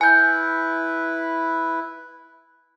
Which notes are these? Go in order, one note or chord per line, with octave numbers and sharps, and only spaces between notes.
E4 B4 G#5 G6